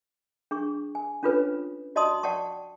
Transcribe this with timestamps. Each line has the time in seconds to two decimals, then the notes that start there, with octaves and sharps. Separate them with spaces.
0.51 D4 G#4 C#6
0.95 G#5
1.23 C#4 D4 F4 A4 B4 C#5
1.96 F#4 D5 D#5 A5 C6 D#6
2.23 D5 F#5 G5 A5 C#6